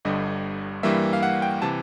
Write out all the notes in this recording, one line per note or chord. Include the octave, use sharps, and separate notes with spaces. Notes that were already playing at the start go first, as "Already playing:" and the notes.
G1 G2 D3 G3 D#5
G2 E3 G3 A#3 E5
F5
F#5
G5
C3 E3 A5